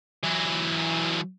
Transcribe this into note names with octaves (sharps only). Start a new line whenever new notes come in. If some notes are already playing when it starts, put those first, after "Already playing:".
E3 F#3